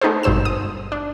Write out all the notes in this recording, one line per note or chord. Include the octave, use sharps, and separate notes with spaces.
A3 B3 D#4 G#4 A4 C5
G#1 G2 B2 C5 E6 E7
D#6
D4